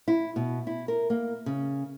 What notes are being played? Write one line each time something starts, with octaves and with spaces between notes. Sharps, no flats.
E4
B2
E4
A#4
A#3
C#3